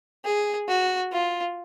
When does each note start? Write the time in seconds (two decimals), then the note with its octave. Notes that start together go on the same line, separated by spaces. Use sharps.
0.25 G#4
0.68 F#4
1.12 F4